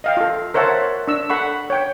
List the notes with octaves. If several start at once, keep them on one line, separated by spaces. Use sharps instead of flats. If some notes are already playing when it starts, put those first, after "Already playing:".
D#5 F5 G5
F4 A4
A#4 C5 C#5 E5 F#5 A5
D4 E6
A4 F#5 B5 C#6
C#5 G5